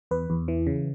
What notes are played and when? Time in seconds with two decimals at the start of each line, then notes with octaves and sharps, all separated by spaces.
0.11 E2 B4
0.30 E2
0.48 E3
0.67 C#3